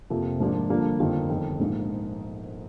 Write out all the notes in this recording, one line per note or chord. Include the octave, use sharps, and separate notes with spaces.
F2 C3 F3 A#3
G#2 F3 A#3 D4 F4
G2 D3 F3 A#3 D4
G1 F2 D#3 A#3 F4
G1 F2 D#3
A#1 G#2 D#3 A#3 D#4